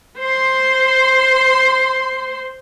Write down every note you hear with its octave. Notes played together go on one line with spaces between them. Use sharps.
C5 C6